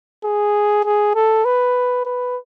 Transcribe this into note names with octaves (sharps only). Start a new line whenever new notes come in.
G#4
G#4
A4
B4
B4